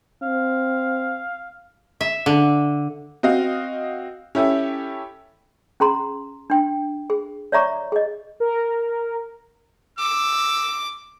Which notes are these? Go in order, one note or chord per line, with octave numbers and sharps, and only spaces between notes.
C4 F5
E5
D3
C4 F#4 D#5 F5
C#4 E4 G4 A4 E5
C#4 G#4 A#5 C6
D4 G5
G#4
C#5 D5 E5 A#5 C#6 D6
G#4 D#5
A#4
D6 E6